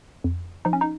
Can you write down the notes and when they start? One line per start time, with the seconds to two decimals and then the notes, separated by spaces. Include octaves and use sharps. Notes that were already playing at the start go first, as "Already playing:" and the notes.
0.24 F2
0.65 F3 D#4
0.73 C#4
0.81 D#4